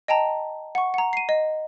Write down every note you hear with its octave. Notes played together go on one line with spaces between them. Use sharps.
D#5 G5 A5 A#5
F#5 C#6
F#5 A#5
C7 D#7
D#5